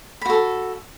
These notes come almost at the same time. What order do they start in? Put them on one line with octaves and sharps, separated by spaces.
B5 F#4 A4